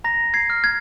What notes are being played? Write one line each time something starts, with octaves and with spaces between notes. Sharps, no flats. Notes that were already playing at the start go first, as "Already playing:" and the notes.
A#5 A#6
G#6 C7
F6
G#6